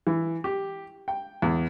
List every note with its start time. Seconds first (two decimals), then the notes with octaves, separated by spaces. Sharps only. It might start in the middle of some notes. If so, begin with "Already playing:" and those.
0.07 E3
0.44 G4
1.08 G5
1.42 E2